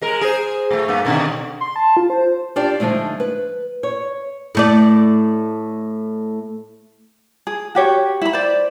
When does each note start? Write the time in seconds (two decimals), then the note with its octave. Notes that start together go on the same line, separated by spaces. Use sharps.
0.02 G#3 A#4
0.21 G#4 C5
0.71 A2 A3
0.88 G2 A#3 B3
1.05 B2 D3 D#3
1.61 C6
1.76 A5
1.97 F4
2.10 C5
2.56 D4 F4 G4 D5
2.80 D3 F3 G#3 A3 D#4
3.20 B4
3.83 C#5
4.55 A2 A3 D5
7.47 G#4
7.75 F#4 G4 C#5
8.22 E4 B5
8.33 C5 D5